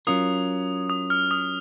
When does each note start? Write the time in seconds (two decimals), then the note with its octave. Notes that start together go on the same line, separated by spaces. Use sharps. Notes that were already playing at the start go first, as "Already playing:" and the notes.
0.07 F#3 C#4 F4 A#4 D#6
0.90 D#6
1.10 F6
1.31 D#6